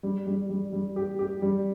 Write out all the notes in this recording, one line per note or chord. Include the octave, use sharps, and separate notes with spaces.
G3
G3
G3
G3
G4
G4
G3